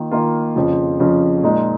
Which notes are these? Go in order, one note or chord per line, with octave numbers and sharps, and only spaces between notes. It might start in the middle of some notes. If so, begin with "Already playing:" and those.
Already playing: D#3 A#3 F4
D#3 A#3 F4
F2 C#3 F3
F2 C#3 F3
A#2 F3 G#3 D#4